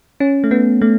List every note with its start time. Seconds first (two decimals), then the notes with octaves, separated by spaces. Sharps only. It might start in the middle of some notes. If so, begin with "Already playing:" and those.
0.20 C#4
0.44 A3
0.51 B3
0.82 A3